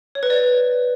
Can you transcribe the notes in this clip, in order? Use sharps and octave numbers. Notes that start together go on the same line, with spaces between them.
C#5
B4
D5